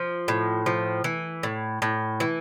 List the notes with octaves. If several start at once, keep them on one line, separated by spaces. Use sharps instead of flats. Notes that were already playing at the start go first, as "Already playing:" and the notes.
Already playing: F3
A2
F3
E3
A2
A2
E3